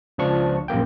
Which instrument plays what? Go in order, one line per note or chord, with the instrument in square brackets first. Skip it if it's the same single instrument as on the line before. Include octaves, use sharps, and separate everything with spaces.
[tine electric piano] C#2 F3 D4 C#6
A#1 F#2 A#3 G5